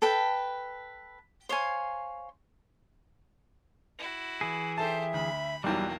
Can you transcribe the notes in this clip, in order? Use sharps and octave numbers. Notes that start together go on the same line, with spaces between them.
A4 B4 G5
C5 C#5 F5 G#5
E4 F#4
E3 G#4
G4 A4 C5 E5 A5
D2 B5
B1 E2 F#3 G3 A#3 G5 A5